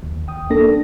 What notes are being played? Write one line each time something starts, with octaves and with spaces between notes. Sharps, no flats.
D#2
G5 D#6
A#3 D4 A4 A#6